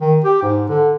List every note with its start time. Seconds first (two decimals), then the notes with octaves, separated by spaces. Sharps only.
0.01 D#3
0.24 G4
0.42 G#2
0.69 D3